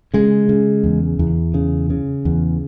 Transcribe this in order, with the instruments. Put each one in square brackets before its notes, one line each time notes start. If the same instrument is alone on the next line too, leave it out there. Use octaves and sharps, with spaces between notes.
[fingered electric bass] C#3 G#3
C#3
E2
E2
C#3
C#3
E2